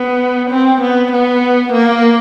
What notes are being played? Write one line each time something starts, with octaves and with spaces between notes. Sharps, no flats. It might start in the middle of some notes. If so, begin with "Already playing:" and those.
Already playing: B3
C4
B3
B3
A#3